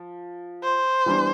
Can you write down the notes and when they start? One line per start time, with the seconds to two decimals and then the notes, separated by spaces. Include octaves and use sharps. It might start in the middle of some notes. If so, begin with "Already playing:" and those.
Already playing: F3
0.63 C5
1.06 E3 G3 B3 D4